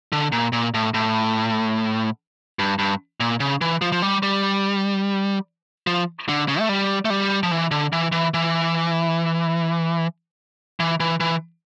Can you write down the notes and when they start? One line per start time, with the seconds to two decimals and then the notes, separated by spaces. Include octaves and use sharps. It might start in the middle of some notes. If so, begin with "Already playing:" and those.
0.12 D3
0.32 A#2
0.53 A#2
0.74 A2
0.94 A2
2.59 G2
2.79 G2
3.20 A#2
3.40 C#3
3.61 E3
3.82 F3
3.92 F3
4.02 G3
4.23 G3
5.87 F3
6.29 D3
6.48 C#3
6.60 A3
6.69 G3
7.05 A3
7.10 G3
7.43 F3
7.51 E3
7.71 D3
7.93 E3
8.12 E3
8.34 E3
10.80 E3
11.00 E3
11.20 E3